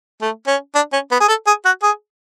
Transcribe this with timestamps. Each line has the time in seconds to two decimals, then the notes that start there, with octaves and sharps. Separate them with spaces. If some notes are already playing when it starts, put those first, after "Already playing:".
0.21 A3
0.47 C#4
0.75 D4
0.93 C#4
1.11 B3
1.20 G#4
1.28 A4
1.47 G#4
1.65 F#4
1.83 G#4